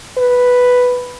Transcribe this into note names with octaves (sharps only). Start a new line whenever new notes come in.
B4